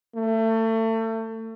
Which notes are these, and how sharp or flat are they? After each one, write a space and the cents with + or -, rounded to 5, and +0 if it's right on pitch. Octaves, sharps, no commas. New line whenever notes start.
A3 +30